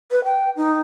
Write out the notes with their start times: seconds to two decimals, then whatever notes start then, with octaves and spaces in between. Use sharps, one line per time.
0.11 B4
0.24 G5
0.56 D#4